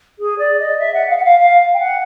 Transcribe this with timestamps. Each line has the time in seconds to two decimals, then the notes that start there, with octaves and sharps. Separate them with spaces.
0.19 G#4
0.38 D5
0.59 D#5
0.79 E5
0.94 F#5
1.09 F5
1.17 F#5
1.24 F5
1.39 F5
1.74 G5
1.79 F#5